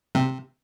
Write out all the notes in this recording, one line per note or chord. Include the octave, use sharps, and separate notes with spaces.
C3